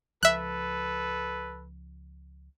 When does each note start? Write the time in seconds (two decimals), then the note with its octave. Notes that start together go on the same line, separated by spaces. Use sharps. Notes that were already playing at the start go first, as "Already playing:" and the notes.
0.23 C#2 F3 A4 B4 E5 F#6